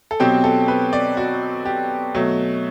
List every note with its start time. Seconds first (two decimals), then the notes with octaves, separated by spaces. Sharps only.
0.11 A4
0.20 B2 F#3 C4 G4
0.44 A4
0.68 B4
0.93 D5
1.17 F#4
1.65 G4
2.15 B2 F#3 A3